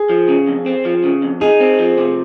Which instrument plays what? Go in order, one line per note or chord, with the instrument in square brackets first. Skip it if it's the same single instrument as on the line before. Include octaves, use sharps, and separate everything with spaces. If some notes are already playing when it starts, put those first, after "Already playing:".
Already playing: [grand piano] G#4
[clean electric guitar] F3
C#3
F2
C4
F3
C#3
F2
[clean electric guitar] D#4 [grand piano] G#4
[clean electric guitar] C4
F3
C3